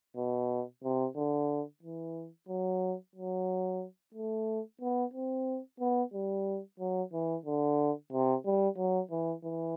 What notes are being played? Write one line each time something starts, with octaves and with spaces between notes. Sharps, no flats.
B2
C3
D3
E3
F#3
F#3
A3
B3
C4
B3
G3
F#3
E3
D3
C3
G3
F#3
E3
E3